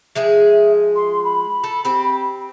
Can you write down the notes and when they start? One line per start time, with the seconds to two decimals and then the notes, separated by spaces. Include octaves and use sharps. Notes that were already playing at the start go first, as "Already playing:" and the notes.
0.16 F3 G#3 G#4 E5
0.95 C6
1.24 B5
1.64 A4
1.85 C4 G4